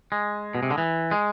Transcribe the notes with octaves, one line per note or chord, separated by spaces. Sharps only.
G#3
B2
C3
D3
E3
G#3